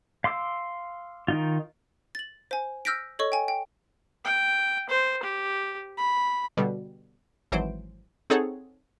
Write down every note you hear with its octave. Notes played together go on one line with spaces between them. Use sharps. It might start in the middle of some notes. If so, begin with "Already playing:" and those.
F5 C6 D6 E6
D#3 D#4 F4
A6 F#7
C5 G#5
E6 F6 G6 A#6 B6 D7
A4 C#5 D#5 C#6
G5 G#5
G5
G5
C5
G4
B5
B2 D3 G3
G#1 E3 F#3 C5 D7
C4 D#4 G#4 A4 C#5 F#5